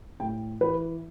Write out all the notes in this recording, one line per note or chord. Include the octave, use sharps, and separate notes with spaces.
A2 G5
E3 B4